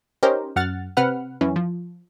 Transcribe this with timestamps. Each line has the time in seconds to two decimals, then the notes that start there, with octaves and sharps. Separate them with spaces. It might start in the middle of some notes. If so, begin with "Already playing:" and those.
0.23 C#4 D#4 G4 A#4 C5
0.56 F#2 F#5 F6 A6
0.97 C3 B4 F#5 F6
1.41 F#2 E3 C#4
1.56 F3